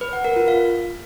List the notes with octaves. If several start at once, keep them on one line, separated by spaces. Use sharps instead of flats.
B4
F#5
A#4
F4
F5